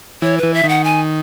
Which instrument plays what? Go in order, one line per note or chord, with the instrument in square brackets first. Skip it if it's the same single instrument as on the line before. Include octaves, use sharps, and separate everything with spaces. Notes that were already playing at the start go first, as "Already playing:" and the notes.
[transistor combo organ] E3 [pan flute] C#5
[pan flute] B4
[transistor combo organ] E3
[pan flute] E5
[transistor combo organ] D#3
[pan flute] F#5
G#5